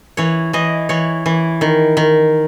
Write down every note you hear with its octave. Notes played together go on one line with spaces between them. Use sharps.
E3 C#5
E3 D#5
E3 C#5
E3
D#3
D#3